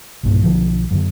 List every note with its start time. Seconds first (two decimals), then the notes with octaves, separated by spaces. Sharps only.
0.23 B1 G2 A#2
0.43 B1 D3 F3
0.91 F#2 D3